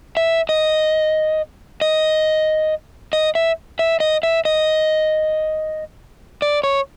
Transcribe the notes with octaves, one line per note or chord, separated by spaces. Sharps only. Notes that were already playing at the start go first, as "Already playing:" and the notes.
E5
D#5
D#5
D#5
E5
E5
D#5
E5
D#5
D5
C#5